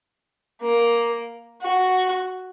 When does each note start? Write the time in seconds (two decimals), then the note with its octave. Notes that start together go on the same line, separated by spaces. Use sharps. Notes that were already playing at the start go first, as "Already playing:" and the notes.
0.62 A#3
1.62 F#4